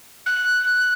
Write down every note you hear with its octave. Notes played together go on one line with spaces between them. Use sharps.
F#6